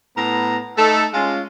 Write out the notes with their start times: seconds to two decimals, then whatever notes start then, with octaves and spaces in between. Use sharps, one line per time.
0.17 A2 B3 A#5
0.78 A3 D#4 A4
1.14 G#3 C#4 F4